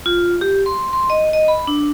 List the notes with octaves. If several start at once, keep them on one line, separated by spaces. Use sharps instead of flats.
F4
G4
C6
C6
D#5
D#5
B5
D4